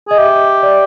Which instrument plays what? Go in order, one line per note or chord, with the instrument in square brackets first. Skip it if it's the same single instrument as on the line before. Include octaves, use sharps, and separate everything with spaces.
[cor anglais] G#4 [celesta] D#5
[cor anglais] G4 [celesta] E5
[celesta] D5